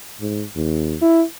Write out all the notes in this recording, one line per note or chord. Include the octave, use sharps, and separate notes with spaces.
G#2
D#2
E4